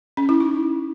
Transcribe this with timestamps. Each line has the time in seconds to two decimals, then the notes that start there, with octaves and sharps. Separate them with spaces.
0.17 C#4
0.29 E4
0.40 D#4